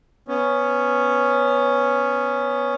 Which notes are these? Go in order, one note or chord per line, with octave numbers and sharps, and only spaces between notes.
B3 C#4